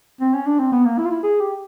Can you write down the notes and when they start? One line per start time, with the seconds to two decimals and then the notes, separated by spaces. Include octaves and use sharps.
0.21 C4
0.34 C#4
0.47 D4
0.59 C4
0.72 B3
0.85 A#3
0.98 E4
1.05 F4
1.11 E4
1.23 G#4
1.40 G4